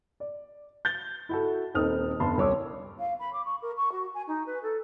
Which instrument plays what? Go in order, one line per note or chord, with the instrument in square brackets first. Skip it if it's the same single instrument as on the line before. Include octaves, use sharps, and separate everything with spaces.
[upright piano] D5
G6 A6 G7
E4 F#4 A4
D#1 C4 D#4 A4 D#6 F6
F1 D3 B3 A5 C6
D#1 C2 C#4 C#5 D6 E6
[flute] F5
B5
D6
C#6
A#4
C#6
F#4
G#5
D#4
B4
A4